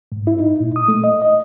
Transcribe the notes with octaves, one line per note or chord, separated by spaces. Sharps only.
G#2
E4
D#4
A#2
D#6
A3
D#5
D#5